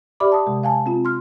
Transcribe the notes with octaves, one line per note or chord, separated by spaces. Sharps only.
G4 D5 E5 B5 D6
A5 D#6
C3 G#3
F5 G#5 A5
C4 F4
C6 F6